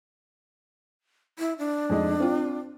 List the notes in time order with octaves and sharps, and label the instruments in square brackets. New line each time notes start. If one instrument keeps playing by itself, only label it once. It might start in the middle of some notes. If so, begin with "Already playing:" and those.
[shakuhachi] E4
D4
[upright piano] F2 G#3 D#4
C4 F4